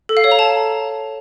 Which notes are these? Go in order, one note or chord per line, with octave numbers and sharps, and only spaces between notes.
A4
F5
C#5
A#5
A5